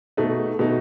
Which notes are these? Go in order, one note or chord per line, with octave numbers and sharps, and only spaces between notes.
B2 A3 D#4
B2 A3 D#4